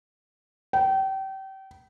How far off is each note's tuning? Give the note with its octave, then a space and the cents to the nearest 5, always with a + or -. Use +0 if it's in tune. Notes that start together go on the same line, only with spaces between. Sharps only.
G5 -30